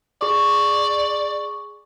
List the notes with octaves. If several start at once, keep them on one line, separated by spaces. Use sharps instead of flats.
G#4 D5 C#6 D6